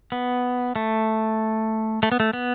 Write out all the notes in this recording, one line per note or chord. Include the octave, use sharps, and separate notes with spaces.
B3
A3
A3
B3
A3
B3